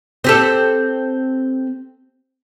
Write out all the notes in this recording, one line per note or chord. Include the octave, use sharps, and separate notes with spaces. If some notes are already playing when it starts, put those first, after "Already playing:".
C4 G4 A4